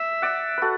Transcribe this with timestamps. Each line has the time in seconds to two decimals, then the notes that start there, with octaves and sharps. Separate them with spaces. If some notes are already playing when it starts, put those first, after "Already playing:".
Already playing: E5
0.22 D5 F#5
0.58 F#4 A4 B4